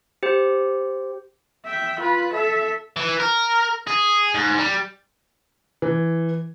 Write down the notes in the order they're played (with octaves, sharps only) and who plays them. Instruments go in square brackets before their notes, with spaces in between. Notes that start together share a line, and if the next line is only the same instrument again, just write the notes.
[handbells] G4 C5
[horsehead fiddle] E5 G5
F4 B4
A4 E5
[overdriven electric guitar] E3
A#4
G#4
G#2
G3
[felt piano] E3